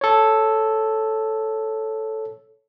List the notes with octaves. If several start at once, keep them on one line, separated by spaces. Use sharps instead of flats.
A4 C#5